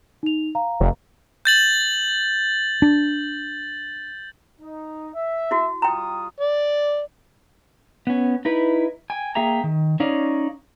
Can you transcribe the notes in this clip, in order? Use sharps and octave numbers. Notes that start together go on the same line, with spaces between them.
D#4 F7
F5 A#5
F1
G6 A6 F#7
D4
D#4
E5
E4 F#4
G3 F4 G5 A#5 D#6
D5
B3 C#4
D#4 E4 B4
G5 G#5
A#3 G#4 E5 G5 A#5
D#3
C#4 D#4 C#5 D5 F5